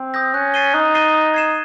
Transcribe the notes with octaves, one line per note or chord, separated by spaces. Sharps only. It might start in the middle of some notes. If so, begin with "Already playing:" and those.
Already playing: C4
D#6 G6 A#6
C#4 F#6
A6 C7 D#7 G7
D#4 F#6
A6 C7 D#7 G7
D#6
G#6 C7 E7